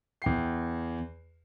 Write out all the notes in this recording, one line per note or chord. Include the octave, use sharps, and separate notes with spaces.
E2 G5 C7